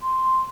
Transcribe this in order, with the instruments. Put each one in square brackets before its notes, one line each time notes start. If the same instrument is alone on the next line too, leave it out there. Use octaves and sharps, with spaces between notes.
[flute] C6